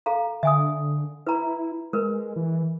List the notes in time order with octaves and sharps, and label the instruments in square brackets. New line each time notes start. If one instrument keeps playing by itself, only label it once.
[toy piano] A4 F5 A#5
[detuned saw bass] D3 [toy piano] E5 G#5 D#6
[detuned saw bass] E4 [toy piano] B4 A#5
[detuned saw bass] G#3 [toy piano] A#4 B4
[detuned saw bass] E3